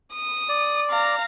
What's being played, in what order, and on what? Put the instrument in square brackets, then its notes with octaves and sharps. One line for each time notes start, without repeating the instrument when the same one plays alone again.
[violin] D#6
[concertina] D5
[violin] F5 A#5